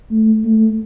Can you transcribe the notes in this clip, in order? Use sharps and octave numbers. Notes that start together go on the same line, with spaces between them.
A3
A3